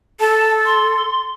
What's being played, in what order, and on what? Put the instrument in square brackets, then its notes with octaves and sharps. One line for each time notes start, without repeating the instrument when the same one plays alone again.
[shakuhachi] A4 [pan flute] A5
[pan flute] C6